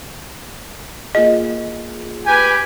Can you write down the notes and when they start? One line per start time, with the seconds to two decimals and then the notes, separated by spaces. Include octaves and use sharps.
1.15 A#3 F4 G#4 D#5
2.27 G4 B4 G#5